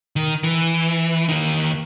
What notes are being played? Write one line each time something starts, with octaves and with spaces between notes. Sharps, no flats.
D#3
E3
D#2 D#3